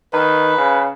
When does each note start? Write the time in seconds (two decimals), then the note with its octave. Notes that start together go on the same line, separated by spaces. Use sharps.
0.13 D#3 B4
0.57 C#3